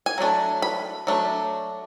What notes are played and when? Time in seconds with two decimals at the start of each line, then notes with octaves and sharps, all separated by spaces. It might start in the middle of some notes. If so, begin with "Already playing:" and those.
0.06 G#5
0.18 F#3 A3 D4
0.62 B5
1.07 F#3 A3 D4